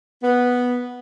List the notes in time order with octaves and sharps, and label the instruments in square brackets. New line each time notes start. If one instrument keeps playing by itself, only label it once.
[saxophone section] B3